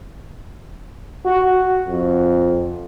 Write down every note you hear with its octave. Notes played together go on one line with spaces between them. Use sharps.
F#4
F2